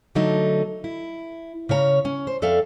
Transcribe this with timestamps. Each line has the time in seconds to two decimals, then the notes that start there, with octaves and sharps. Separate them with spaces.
0.15 D3 F#3 A3 D#4
0.84 E4
1.69 C#3 C#4 C#5 A5 A#5
2.05 C#4
2.27 C5
2.42 F2 A4 D5 E5 F5